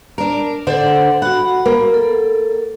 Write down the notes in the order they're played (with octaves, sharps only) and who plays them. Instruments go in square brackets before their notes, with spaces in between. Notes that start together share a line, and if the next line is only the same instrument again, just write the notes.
[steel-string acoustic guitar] D4 A#4
[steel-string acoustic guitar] D3 C5 D5 [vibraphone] A4 F#5
[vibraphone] F#4 B5 [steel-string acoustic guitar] F#5
[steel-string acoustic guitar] A#3
[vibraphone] A4